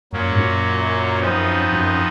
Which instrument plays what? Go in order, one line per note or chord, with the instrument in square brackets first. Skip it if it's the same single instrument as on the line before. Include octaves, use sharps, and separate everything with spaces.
[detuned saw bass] F#2 [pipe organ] A#2 F#3 A#3 C#4
[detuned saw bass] G#2
F#2
[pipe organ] F2 F3 B3 D#4
[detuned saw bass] F#2